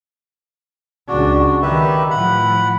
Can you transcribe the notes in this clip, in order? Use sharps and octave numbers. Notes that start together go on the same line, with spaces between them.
C#2 D4 F#4
D#3 G4 B4 E5
A2 F3 F#5 B5